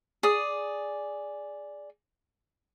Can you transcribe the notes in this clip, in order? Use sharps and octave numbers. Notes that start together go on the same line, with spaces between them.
G#4 D5 D#6